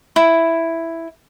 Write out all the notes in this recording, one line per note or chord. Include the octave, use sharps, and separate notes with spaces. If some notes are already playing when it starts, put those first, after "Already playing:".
E4